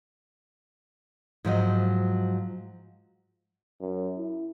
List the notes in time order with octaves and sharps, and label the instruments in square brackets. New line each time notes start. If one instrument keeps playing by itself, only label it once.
[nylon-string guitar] G#2 F3 F#3 D#5
[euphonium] F#2
E4